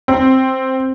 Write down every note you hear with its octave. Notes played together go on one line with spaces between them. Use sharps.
C4